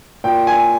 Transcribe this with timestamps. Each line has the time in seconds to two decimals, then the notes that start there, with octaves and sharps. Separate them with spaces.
0.24 A#2 G5
0.47 G#5